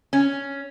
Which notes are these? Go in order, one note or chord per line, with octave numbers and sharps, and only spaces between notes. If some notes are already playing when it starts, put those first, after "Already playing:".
C#4